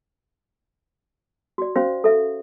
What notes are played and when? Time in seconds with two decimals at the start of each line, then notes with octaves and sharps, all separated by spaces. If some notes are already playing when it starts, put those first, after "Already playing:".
1.58 F#4 D5
1.76 C#4 F#4 C5 F5
2.04 A4 E5